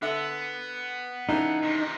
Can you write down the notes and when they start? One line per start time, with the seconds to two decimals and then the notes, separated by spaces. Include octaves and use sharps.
0.02 D3 B3 E5
1.29 C#3 E3 D4 D#4
1.62 C3 D#3